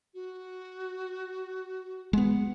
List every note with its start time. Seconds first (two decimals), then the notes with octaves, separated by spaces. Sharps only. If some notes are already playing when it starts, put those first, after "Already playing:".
0.13 F#4
2.13 G#3 B3 F#5